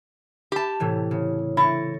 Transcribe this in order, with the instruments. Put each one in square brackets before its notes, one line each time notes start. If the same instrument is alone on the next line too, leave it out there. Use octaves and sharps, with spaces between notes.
[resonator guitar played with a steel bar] G4 A5
[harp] A2 C3 E3
C#3
[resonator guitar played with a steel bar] E4 [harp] C#6 A6 A#6